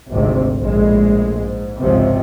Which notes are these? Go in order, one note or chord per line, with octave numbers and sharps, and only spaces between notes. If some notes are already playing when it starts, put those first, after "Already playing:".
G#1 D2 G#2 C3
A#1 A2 G#3
G#2
G#1 C#2 G#2 C3 F3